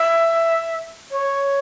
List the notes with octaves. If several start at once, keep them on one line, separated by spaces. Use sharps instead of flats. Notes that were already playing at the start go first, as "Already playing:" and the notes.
Already playing: E5
C#5